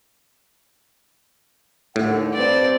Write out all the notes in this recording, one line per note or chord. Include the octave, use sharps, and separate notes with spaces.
D#2 A2 D3 F#5
G2 C4 D5